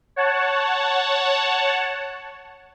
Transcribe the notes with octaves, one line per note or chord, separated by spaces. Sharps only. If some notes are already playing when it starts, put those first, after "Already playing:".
C#5 F#5 A5